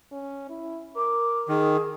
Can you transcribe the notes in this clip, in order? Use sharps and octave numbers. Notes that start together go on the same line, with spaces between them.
C#4
E4
A#4 D6
D#3 G#4